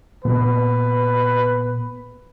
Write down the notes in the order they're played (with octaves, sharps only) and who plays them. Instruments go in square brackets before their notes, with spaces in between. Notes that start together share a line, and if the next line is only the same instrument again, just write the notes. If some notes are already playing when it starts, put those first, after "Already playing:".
[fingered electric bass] A#2 B3 [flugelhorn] B4